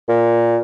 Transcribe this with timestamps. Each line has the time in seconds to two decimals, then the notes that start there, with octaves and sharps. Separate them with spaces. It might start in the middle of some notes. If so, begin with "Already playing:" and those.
0.09 A#2